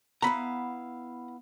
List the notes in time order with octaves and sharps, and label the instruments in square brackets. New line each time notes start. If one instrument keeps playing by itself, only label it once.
[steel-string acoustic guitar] B3 E4 F5 [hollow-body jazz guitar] A#5 B5